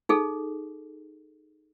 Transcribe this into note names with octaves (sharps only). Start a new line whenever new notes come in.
D#4 G#4 A4